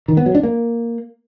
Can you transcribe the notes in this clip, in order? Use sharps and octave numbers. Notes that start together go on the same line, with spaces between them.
D#3
B3
F#3
D4
A#3